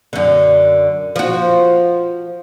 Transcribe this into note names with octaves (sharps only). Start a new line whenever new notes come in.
F#2 D3
F3 F#4